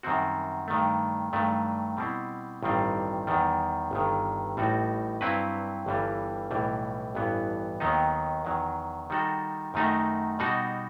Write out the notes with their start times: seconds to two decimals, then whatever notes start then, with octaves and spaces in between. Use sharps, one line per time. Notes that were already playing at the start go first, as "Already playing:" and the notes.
0.03 F#2 D#3 G3 C4 F#4
0.68 G2 D#3 A3
1.33 G2 D#3 F#3 A3
1.97 B2 G3 C4 E4
2.63 A1 G2 D#3 G3 C4
3.27 E2 D#3 G3
3.91 G1 G2 D#3
4.57 A1 A2 G3 D#4 F#4
5.21 G2 F#3 C4 E4 B4
5.86 G1 G2 E3 G3
6.50 B1 A2 E3 G3
7.15 A1 G2 E3 B3
7.80 D#2 D#3 F#3 B3 D#4
8.45 E2 D#3 F#3
9.10 D#3 G3 D#4 F#4 A4
9.74 F#2 D#3 A3 D#4 F#4
10.39 B2 G3 D#4 F#4